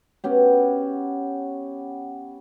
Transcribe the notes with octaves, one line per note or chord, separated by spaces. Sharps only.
B3 C#4 G4